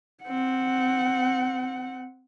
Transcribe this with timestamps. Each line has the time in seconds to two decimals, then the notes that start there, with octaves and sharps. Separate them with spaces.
0.23 C4 F#5